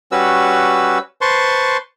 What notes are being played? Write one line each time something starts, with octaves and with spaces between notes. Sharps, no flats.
G3 C#4 F#4 B4 E6
B4 C5 A5 C6 C#6